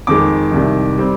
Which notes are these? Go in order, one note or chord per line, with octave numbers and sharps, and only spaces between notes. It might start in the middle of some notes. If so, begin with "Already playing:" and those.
F2 D#3 G#3 D6
C2 C3 D#3
G3 C4